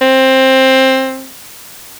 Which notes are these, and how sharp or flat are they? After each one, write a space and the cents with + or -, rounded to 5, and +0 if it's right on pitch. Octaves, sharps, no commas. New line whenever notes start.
C4 +15